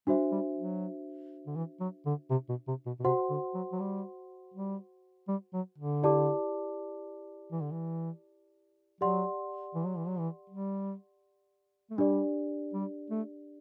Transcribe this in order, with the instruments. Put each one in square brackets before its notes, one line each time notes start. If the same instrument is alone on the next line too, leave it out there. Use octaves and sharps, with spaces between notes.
[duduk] G3 [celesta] D4 F#4 C5 E5
[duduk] G3
F#3
D3
E3
F#3
D3
C3
B2
C3
B2
B2
[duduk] C3 [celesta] F#4 C5 F#5 C6
[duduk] D3
F#3
F#3
G3
G3
G3
F#3
D3
[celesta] E4 G4 D5 A5 D6
[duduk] E3
D3
E3
[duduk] F#3 [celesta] G4 D5 F#5 C6
[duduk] E3
F#3
E3
F#3
E3
G3
A3
[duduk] G3 [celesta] D4 G4 D5
[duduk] G3
A3